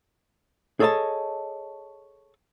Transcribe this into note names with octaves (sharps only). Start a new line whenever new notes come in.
G#4 A4 C#5 D#5 A5